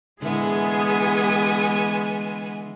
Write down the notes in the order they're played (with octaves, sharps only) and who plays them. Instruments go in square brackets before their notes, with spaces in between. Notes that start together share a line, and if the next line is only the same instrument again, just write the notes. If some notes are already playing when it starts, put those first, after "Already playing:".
[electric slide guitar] D3 E4 [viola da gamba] E3 G#3 [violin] B3 G#5 [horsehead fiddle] G#4